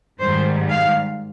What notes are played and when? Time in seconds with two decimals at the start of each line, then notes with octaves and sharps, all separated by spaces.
0.20 G#2 D#3 G3 C5
0.70 F5